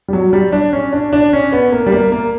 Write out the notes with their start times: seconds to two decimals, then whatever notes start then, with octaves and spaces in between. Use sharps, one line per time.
0.08 G3
0.13 F#3
0.33 G3
0.52 D4
0.73 C#4
0.93 D4
1.13 D4
1.33 C#4
1.53 B3
1.72 A#3
1.86 G3
1.92 A#3
2.12 A#3